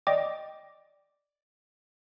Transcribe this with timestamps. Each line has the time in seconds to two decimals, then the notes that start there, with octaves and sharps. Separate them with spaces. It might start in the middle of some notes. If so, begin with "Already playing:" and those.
0.07 D5 D#5 G5 D6